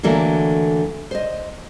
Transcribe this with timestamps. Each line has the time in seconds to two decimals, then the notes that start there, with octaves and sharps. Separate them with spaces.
0.03 D3 E3 F#3 A3 A#3
1.11 C5 D#5